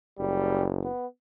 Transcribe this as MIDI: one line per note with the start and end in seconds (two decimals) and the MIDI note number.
0.18 0.87 30
0.18 0.64 55
0.84 1.06 59